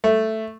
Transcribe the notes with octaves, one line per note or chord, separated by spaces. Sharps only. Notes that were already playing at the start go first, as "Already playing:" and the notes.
A3